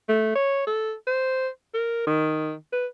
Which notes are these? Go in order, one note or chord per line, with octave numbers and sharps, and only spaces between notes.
A3
C#5
A4
C5
A#4
D#3
B4